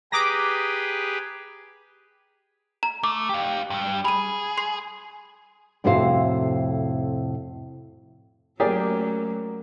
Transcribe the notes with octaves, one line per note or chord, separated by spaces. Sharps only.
G4 G#4 B4 A#5 D6 D#6 A#6
A#5
A3 D6
G4 F5
G2 G3
G#4 B5 D#7
C6 C7
F2 A2 C3 F#4 C5 F5
F#3 A3 A#3 C#4 G4 G#4 D5